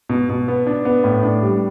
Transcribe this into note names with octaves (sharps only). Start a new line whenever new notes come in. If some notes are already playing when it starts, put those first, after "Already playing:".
B2
B2
B3
D4
B3
A2
D4
G3